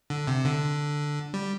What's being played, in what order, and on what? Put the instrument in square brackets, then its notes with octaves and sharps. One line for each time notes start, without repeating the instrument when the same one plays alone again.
[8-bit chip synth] D3
C3
D3
G3